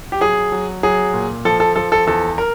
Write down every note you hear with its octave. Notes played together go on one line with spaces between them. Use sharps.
G4
F#3 G#4
F#3
F#3 G#4
A#2
F3 A4
A4
F3 A4
A4
E2 A4
A#4